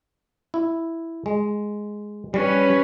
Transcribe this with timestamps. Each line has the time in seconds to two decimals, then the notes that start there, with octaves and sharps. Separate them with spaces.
0.54 E4
1.26 G#3
2.34 G3 C#4 B4